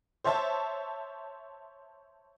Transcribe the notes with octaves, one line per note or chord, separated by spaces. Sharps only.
C5 C#5 E5 A5